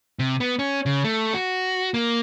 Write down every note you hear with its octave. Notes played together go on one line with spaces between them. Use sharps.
C3
B3
C#4
C#3
A3
F#4
A#3